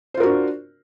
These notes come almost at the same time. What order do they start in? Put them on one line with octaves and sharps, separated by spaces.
C5 F4 A#4 F#4 D4